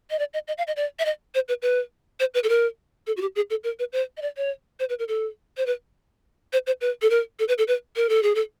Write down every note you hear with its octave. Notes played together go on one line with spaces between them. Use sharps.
D#5
D5
D#5
D#5
F5
D#5
D5
E5
D#5
C5
B4
B4
C5
B4
A4
A#4
A4
F#4
G4
G#4
A4
A#4
B4
C5
D#5
D5
C#5
C5
B4
A#4
A4
C5
B4
C5
C5
B4
A4
A#4
A4
B4
A4
B4
A#4
A4
G#4
A4